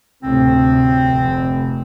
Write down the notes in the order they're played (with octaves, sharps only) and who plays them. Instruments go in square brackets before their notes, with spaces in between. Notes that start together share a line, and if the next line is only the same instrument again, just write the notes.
[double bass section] D2 A2 C3 [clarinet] C4
[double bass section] F1